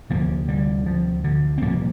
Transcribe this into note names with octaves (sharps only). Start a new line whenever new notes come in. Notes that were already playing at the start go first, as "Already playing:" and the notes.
D2 C3 F3 A#3
D3 G3
F3
D3
C4
C2 A#2 F3 A#3